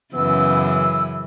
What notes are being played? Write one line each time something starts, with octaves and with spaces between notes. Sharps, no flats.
F#2 C#3 E3 B3 E6